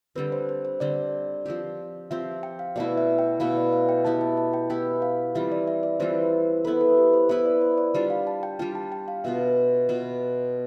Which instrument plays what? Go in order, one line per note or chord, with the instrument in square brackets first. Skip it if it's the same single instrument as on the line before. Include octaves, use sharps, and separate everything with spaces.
[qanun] D3 G3 C4 [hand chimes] B4
[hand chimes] C5
C5
C5
[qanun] D3 G3 C4 [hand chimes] D5
[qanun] F3 C4 G4
[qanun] F3 C4 G4 [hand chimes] E5
[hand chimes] G5
F5
[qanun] B2 A3 E4 [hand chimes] D5
[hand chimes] E5
G5
[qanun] B2 A3 E4 [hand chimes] F5
[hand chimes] D5
F5
G5
[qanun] B3 E4 G4 [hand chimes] A5
[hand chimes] A5
A5
G5
[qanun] B3 E4 G4 [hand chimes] G5
[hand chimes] F5
[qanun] E3 G3 C4 F4 [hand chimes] E5
[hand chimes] D5
E5
D5
[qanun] E3 G3 C4 F4 [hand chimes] C5
[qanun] B3 E4 B4 [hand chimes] A4
[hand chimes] A4
G4
C5
[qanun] B3 E4 B4 [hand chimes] E5
[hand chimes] D5
C5
D5
[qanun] G3 D4 F4 [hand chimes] D5
[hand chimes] F5
A5
G5
[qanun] G3 D4 F4 [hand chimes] G5
[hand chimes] A5
G5
F5
[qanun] B2 B3 F4 [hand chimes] E5
[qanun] B2 B3 F4